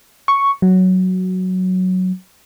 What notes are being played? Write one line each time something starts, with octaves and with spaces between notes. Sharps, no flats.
C#6
F#3